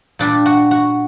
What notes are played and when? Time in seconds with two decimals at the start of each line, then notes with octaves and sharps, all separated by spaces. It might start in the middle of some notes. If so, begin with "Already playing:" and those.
0.19 A#2 G3 D4
0.46 F#4
0.71 F#4